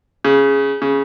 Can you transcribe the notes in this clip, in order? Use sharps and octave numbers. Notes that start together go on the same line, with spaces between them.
C#3
C#3